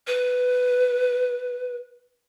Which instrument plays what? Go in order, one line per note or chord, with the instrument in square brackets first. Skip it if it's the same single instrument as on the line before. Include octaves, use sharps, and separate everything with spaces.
[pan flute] B4